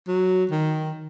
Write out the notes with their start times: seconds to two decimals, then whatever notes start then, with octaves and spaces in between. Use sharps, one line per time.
0.08 F#3
0.51 D#3